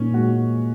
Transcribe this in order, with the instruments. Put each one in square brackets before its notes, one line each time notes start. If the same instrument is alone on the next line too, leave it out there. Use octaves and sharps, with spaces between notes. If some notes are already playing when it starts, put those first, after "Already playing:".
Already playing: [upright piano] A#2 D#4 [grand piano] C#4
[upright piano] G#3 [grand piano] F#4